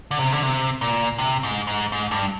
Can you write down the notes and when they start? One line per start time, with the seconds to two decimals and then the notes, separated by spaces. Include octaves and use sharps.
0.11 D3
0.19 C3
0.32 D3
0.43 C3
0.81 A#2
1.18 C3
1.43 G#2
1.67 G#2
1.92 G#2
2.11 G2